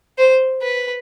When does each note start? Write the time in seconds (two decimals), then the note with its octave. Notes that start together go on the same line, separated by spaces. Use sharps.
0.18 C5
0.62 B4